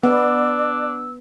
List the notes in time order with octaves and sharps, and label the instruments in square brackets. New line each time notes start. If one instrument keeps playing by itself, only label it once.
[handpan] B3 [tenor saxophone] D4 [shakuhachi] D5 [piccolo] E6